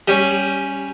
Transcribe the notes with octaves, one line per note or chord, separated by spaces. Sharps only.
G3 C#4